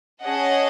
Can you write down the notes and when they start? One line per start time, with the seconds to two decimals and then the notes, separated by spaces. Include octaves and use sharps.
0.23 C#4 G#4 D#5 F#5 A5